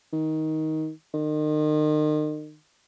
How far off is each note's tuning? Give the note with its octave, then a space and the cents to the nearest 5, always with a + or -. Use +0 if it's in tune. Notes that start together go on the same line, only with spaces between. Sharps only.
D#3 +15
D#3 -35